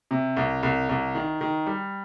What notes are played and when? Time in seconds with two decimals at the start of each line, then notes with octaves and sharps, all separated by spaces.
0.11 C3
0.37 C2
0.63 C2
0.89 C2
1.15 D#3
1.41 D#3
1.66 G3